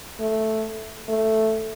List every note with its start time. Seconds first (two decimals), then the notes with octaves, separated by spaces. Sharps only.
0.20 A3
1.09 A3